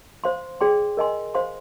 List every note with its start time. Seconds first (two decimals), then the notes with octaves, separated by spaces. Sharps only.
0.24 C5 F5 C6
0.61 G#4 D5 G5 C6
0.97 A#4 D#5 G#5 C6
1.35 C5 F5 C6